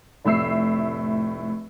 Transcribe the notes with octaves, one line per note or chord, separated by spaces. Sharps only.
F1 A2 E5 E6 C7